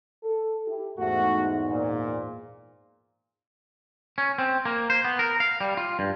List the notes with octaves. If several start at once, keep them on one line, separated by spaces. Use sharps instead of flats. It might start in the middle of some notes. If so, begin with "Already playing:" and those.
A4
E4 G4
E2 G#2 A3 F#4
A#2
C#4
C4
A#3
C5
B3
A#4
F5
G3
F4
G2